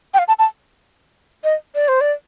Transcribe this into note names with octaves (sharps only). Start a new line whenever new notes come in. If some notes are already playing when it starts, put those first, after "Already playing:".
G5
F5
A5
A5
D#5
D5
C5
D5